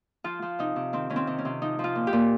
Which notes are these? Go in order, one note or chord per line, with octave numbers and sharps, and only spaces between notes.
F3 F4
F3
C3 D#4
C3
D#3 C4
D#3 C#4
C4
C3
C#4
C3
F3 D#4
F3
F4
A#2
G4
A#2